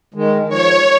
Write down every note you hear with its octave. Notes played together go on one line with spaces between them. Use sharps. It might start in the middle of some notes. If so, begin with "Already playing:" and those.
D#3 G#3
F3 C#5